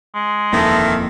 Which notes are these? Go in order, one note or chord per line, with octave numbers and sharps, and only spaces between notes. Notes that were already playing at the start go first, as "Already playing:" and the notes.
G#3
D#1 F2 D#3 E3 A#3 A4